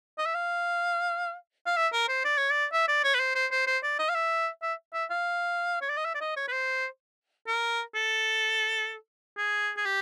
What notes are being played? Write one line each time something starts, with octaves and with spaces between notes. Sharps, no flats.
D#5
E5
F5
F5
E5
A#4
C5
D5
C#5
D5
E5
D5
C#5
B4
C5
C5
C5
C5
D5
D#5
F5
E5
E5
E5
F5
C#5
D5
D#5
E5
D5
D#5
C#5
B4
C5
A#4
A4
G#4
G#4
G4